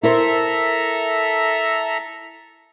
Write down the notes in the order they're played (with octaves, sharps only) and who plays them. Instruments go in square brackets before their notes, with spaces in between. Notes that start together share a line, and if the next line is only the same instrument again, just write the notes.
[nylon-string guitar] E4 A#4 C5 [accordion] A4 E5 A#5